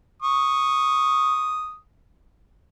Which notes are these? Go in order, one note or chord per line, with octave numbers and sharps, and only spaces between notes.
C#6 D#6